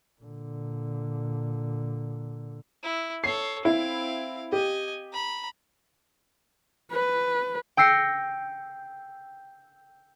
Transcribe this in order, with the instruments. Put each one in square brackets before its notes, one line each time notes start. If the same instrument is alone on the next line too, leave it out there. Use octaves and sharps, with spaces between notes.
[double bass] A#2 D3
[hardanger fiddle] E4
[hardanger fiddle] A4 C#5 [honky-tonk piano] C7
[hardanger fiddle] C4 F5 [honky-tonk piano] E4
[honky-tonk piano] G4 [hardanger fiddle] D#5 G#5
[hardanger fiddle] A#5 B5
[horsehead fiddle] B4
[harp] G5 E6 A#6 C7 C#7